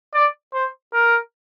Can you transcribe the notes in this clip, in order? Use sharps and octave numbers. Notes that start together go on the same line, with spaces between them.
D5
C5
A#4